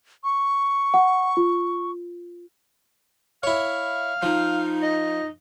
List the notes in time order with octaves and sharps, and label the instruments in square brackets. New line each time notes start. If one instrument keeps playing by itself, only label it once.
[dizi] C#6
[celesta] F#5
F4
[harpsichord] E4 C#5 [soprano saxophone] F5
[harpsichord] F3 [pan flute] D#4
[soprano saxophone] D#5